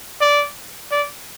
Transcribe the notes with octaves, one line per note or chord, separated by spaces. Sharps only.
D5
D5